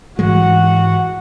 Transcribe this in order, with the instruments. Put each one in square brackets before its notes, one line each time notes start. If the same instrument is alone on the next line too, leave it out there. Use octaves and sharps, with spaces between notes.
[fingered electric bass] G#2 E3 G#3 [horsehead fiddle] F#4 F#5